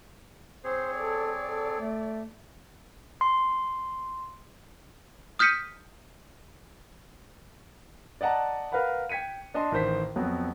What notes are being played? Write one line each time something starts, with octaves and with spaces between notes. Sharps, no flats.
C4 G#4 C5 C#5
A4 D5
A4
A3
C6
D#6 F6 G6 B6 C#7 D#7
D5 D#5 F#5 A5 A#5
A#4 B4 F5 F#5 B5
G5 G#6 B6 C#7 D#7
D4 D#5 A5 C6
A1 D#3 C5 B6
F2 F#3 B3